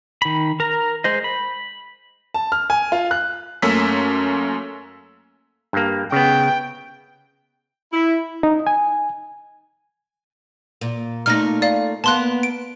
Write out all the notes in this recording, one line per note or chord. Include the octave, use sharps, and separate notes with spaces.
D#3 B5
A#4 A#5
G#3 C5 D#5
B5
A5
F6
G#5
F4
F#6
F#2 A3 A#3 C#4 E6 B6
G2 A#3
C#3 B3 G5
E4
D#4
G#5
A#2
A#2 A3 D#4 F6 A#6
D5 F5
A#3 B3 A5 C6 F#6
D7